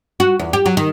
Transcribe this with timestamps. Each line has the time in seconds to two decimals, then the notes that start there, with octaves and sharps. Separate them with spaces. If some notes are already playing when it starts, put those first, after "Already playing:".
0.20 F#4
0.39 E2
0.53 G4
0.66 F#3
0.77 D#3